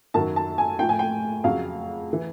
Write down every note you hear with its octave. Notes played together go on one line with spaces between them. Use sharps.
F#2 D#3 F#3 A5
A5
G#5
A2 F3 G5
G#5
G5
F2 C#3 F#3 F5
E3